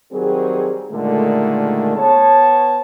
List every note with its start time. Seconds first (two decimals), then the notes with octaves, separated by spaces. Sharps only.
0.12 D#3 F#3 G3 C4 G#4
0.91 A#2 D3 D#3 G#3 A3
1.96 B3 C#5 A5